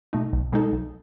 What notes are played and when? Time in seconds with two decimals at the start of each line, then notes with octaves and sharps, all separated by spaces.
0.13 B2 A3 D#4
0.33 B1
0.52 B2 G#3 D#4 A4
0.73 B1